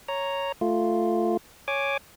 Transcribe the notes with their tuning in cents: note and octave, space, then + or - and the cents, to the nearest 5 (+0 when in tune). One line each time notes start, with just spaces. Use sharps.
C#5 +0 A#5 +0
A3 +0 F4 +0
C#5 +0 G#5 +0 D6 +5